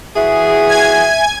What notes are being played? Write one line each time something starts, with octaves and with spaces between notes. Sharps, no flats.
E3 F#4 G#4 E5
G#5 G#6